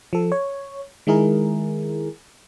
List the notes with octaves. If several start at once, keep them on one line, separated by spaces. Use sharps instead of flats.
F3 A4
C#5
D#3 G#3 E4 G#4 A#4